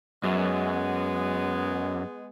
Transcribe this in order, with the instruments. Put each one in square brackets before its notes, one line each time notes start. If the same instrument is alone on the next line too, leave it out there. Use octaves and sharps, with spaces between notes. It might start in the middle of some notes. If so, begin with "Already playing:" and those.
[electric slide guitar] F#2 [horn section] G#3 B3